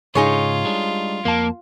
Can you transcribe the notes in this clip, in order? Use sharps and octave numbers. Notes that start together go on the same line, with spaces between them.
G#2 C#3 D#4 F4 G#4 C#5
G3 G#3 D4
F2 A#3 A5